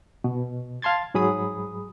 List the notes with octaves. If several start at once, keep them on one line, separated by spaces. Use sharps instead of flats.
B2
F5 A5 C6 G#6 A6
G#2 F#3 G#4 B5 D#6